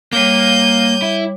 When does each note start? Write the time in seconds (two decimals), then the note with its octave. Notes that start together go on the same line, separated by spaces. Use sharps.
0.13 G3 A#3 C#5 D6 G6 D#7
1.02 E4